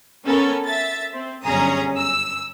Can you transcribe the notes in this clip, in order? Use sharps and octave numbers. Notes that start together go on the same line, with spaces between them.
B3 C#4 A4 A#4
E5 A6
C4
G1 F#2 C#4 G#4 A#5 D#6
E6